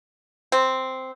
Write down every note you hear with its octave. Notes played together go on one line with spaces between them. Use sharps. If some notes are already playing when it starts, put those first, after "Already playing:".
C4